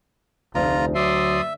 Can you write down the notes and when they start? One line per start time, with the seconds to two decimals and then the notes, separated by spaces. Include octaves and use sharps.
0.55 F1 D2 F4 A#5
0.95 F#3 D5 E5 C6 D#6